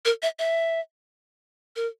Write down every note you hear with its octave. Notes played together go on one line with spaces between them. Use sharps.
A#4
E5
E5
A#4